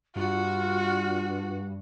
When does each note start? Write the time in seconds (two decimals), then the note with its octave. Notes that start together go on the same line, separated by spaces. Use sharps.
0.16 G2 F4 F#4